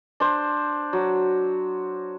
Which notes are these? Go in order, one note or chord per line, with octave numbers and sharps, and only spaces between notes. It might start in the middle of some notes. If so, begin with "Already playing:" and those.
D4 C5
F#3